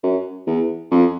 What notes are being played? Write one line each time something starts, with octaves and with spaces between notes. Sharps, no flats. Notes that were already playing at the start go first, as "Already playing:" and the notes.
F#2
E2
F2